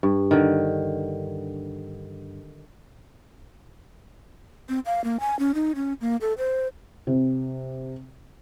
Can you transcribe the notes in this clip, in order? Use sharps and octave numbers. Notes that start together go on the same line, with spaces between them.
G2
D3 D#3
C4
F5
A#3
G#5
C#4
D#4
C#4
A#3
A4
C5
C3